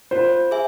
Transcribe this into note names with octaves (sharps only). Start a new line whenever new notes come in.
F4 C5
G#4 E5 G#5